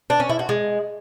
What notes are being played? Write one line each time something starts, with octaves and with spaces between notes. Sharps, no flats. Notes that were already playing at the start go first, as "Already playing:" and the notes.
D4
C#4
E4
F#4
G#3